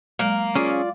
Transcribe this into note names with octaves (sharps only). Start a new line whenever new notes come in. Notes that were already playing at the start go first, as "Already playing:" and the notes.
F#3 G#3 A#3
C#4 F4 G#4 D5